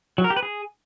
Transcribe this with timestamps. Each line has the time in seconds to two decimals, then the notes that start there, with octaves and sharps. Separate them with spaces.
0.18 F#3
0.24 A#4
0.30 G4
0.36 B4
0.43 G#4